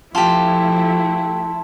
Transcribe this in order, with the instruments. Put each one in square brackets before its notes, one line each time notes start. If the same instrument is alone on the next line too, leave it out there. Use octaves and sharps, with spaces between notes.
[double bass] F3 [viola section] A3 E4 [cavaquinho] F4 G4 [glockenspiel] A5 C6